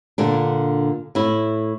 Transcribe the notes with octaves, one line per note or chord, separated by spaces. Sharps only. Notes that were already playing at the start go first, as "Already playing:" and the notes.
A#2 D3 D4
A2 E4